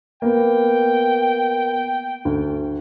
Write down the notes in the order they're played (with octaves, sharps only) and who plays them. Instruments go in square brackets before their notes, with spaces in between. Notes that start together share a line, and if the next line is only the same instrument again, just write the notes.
[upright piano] A#3 B3 [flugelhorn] G5
[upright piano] D2